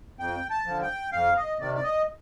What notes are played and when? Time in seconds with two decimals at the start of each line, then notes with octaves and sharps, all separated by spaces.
0.19 F2 G5
0.50 A5
0.66 D3 F3
0.82 G5
1.12 F2 F5
1.37 D#5
1.60 C3 D#3 D5
1.75 D5
1.83 D#5